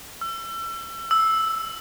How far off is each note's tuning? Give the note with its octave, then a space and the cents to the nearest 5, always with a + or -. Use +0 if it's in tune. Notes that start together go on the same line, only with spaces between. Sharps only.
E6 +35
E6 -5